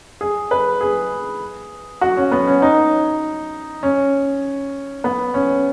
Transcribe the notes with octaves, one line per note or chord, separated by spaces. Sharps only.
G#4
B4
G#4
F#4
C#4
B3
C#4
D#4
C#4
B3
C#4